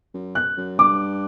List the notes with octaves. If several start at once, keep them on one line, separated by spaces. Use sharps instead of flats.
F#2
F#6
F#2
G2 D6